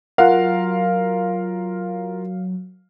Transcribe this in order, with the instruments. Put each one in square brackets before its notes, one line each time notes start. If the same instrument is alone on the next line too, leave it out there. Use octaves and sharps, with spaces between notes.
[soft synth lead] F#3 [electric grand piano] F4 A#4 [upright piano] F5 [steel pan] F#5